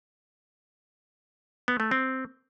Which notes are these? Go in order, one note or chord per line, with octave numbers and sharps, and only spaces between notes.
B3
A3
C4